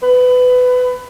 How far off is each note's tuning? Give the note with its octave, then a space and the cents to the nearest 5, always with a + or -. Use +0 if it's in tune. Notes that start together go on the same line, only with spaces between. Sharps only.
B4 +20